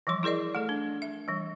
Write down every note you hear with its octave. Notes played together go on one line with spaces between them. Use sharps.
E3 F3 G3 C6
E4 G#4 A#4 D5 D#5
A3 A4
D4
E5
E3 G3